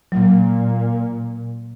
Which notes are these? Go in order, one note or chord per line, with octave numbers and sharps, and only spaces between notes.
A#2 F#3